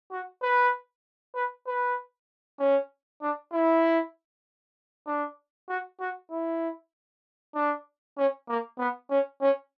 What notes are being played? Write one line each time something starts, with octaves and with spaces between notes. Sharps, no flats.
F#4
B4
B4
B4
C#4
D4
E4
D4
F#4
F#4
E4
D4
C#4
A#3
B3
C#4
C#4